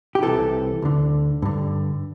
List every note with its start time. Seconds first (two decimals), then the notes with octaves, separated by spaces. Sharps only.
0.15 G4
0.23 C2 C3 E3 A4
0.82 D2 D3
1.42 G2 D3